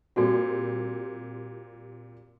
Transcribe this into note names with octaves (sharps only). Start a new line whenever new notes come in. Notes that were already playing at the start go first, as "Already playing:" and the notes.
A#2 G3 C4 F#4 A4 D5